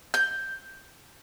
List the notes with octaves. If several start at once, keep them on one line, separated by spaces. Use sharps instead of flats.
G6